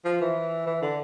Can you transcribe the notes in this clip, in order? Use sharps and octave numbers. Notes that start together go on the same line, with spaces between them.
F3
E3
E3
D3